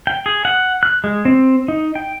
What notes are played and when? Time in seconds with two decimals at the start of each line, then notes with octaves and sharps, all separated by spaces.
0.07 G5
0.26 G#4
0.45 F#5
0.83 F#6
1.04 G#3
1.25 C4
1.68 D#4
1.95 G5